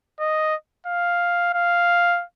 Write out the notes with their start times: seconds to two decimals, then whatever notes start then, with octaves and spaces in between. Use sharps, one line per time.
0.20 D#5
0.87 F5
1.54 F5